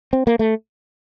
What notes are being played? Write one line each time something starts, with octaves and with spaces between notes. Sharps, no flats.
C4
A#3
A3